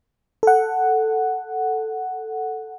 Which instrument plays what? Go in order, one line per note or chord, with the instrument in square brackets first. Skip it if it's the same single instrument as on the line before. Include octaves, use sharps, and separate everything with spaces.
[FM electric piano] A4 F#5